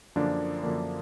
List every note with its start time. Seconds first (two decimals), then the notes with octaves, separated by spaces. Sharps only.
0.16 F#2 D3 F3 A#3 D4
0.63 F#2 D3 F3 A#3 D4